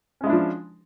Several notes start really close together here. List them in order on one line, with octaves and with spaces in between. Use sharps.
C#4 G#3 E4 D4 F3